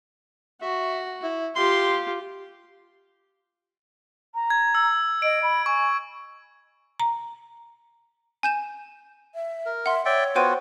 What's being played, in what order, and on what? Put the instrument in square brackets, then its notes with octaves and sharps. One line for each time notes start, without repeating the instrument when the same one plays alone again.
[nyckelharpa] F#4 [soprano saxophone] E5
[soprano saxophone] E4
[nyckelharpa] F4 G4 [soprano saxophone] C6
[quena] A#5
[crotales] G#6
E6
[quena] D#5 [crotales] D7
[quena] B5
[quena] G#5 [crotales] C#6
[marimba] A#5
[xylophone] G#5 G6 E7
[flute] E5
[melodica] A#4
[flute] E5 [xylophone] F#5 C6
[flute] C#5 [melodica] D5 E5 G5
[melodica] B3 F4 F#4 [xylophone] C5 G5 D#7